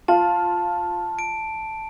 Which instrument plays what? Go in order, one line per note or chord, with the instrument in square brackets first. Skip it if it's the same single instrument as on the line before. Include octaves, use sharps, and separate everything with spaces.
[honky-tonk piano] F4 [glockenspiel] A5
[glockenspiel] D7